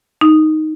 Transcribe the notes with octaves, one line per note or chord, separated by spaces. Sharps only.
D#4